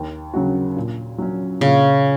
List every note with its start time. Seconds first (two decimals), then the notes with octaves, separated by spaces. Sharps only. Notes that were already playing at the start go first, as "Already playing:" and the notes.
Already playing: D#2
0.34 C#3 F#3 C#4 F#4
0.76 A#2
1.18 F#3 C#4
1.61 A#2 C#3 C#4